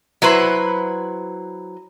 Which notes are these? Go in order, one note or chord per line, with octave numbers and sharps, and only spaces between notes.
F#3 E4 B4 C5